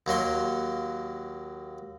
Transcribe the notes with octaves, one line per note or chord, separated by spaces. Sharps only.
D#2 F#3 A#3 C6